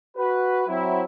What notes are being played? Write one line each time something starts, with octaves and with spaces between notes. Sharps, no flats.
F#4 B4
F#3 C4 E4